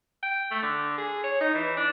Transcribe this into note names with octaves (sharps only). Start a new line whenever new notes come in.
G5
A3
D3
G#4
C#5
D#4
E3
D4